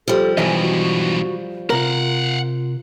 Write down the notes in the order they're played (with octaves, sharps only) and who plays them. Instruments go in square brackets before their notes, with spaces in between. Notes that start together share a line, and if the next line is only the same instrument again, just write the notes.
[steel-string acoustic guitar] F3 G3 [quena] A4
[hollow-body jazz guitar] B1 E3 D#5 [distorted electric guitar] G2 B2 [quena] G#5
[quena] F#4
[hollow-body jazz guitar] C3 A#4 [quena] F4 [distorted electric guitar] F5 F#5